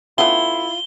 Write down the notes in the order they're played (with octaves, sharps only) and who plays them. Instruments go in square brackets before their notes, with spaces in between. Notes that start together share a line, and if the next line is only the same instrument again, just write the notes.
[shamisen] A3 B3 C#4 [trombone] E4 [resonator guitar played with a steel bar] F4 [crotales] G7